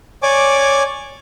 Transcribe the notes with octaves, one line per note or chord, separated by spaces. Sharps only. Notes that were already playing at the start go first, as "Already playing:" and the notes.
C#5 D5 G#5 D6